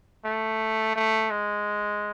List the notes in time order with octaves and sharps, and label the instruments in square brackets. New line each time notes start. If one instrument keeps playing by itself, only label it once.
[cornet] A3
A3
G#3